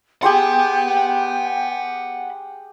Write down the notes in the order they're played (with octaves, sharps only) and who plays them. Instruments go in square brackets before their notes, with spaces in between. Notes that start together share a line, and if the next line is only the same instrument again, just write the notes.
[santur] G4 G#4 C6 [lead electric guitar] F#5 B5 [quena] G5